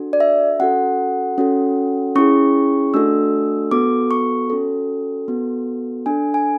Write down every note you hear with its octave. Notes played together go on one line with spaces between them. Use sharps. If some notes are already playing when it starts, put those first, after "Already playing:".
Already playing: D4 F#4 A4
D5
E5
C#4 F#4 A4 F#5
C#4 F#4 A4
C#4 E4 G#4 C#6
A3 D4 F#4 A4 E6
B3 F#4 A4 D6
C#6
C#4 F#4 A4
B3 F#4 A4
D4 A4 G#5
G#5